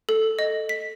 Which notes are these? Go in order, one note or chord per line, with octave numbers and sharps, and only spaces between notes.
A4
D#5
B6